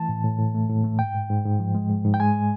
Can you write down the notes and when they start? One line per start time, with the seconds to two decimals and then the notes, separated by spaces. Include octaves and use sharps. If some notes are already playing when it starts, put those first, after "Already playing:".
Already playing: E3 A3 A5
0.09 A2
0.24 A2
0.39 A2
0.54 A3
0.70 A2
0.84 A3
0.99 G#2 G5
1.14 G#2
1.30 G#2
1.45 G#2
1.59 F3
1.75 G#3
1.90 G#2
2.05 G#2
2.14 G5
2.20 G#3 G#5